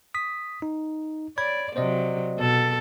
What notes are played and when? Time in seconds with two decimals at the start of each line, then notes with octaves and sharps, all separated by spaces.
0.14 D#6 B6
0.62 D#4
1.38 C#5 D5 B5 G#6
1.76 C3 F#3 C5 D5 D#5
2.38 B2 A4